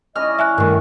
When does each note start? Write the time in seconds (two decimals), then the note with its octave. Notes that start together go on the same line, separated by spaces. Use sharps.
0.16 G3 C#4 E4 D#5 F6
0.39 E5 G#5 F#6
0.58 G2 D#3 A3